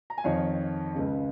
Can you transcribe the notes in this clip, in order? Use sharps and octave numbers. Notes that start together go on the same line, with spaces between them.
A#5
G#5
F2 D#3 C#5 F5
C#2 C#3